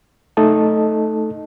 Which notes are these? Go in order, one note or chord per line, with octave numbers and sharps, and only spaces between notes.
A3 D#4 A4 D#5 A5